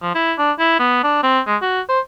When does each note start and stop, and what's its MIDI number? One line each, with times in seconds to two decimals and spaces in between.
0.02 0.14 53
0.15 0.33 64
0.38 0.51 62
0.59 0.79 64
0.79 1.03 59
1.04 1.21 62
1.23 1.40 60
1.47 1.56 56
1.62 1.81 66
1.89 2.00 72